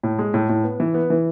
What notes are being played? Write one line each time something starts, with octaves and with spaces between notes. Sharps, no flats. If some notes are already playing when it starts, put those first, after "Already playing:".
A2
G#3
A2
A2
B3
E3
B3
E3